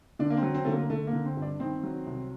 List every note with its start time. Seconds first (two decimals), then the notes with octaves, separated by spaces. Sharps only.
0.19 D3 D4
0.30 A#3
0.37 C4
0.43 F#3
0.54 C4
0.65 D3 A3
0.72 A#3
0.90 D3 A3
1.07 A#3
1.13 D3
1.25 C4
1.37 G2
1.42 D4
1.60 D#3 C4
1.83 F#3
2.06 C2